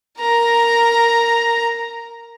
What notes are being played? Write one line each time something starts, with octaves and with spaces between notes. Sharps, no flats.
A#4 A#5